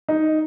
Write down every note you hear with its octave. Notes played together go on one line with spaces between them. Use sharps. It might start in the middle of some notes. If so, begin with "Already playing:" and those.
D#4